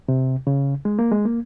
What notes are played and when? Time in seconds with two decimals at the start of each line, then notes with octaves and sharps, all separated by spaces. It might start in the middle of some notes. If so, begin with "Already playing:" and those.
0.09 C3
0.47 C#3
0.85 G#3
0.99 A#3
1.12 G#3
1.25 A#3